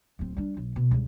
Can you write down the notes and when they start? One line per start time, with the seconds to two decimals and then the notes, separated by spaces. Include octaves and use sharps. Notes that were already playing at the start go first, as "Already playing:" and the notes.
0.19 D1 C4
0.37 G3 D4
0.57 B1
0.76 B2
0.91 C#2 G2